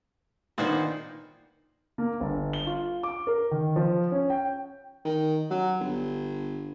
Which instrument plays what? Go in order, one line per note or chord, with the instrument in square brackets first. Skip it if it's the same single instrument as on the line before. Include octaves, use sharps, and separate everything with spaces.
[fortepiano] A#2 B3 D4 [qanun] D#3 D#4 C5
[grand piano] A#3
G1
G7
F4
D6
A#4
D#3
F3
C#4
G5
[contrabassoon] D#3
F#3
G1